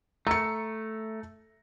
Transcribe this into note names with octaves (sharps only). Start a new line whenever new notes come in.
A3 A#5 C#7